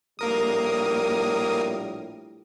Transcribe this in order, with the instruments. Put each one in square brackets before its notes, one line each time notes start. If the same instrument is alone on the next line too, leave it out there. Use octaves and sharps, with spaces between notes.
[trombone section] A#1 A2 G3 [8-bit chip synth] A#3 A#4 D#6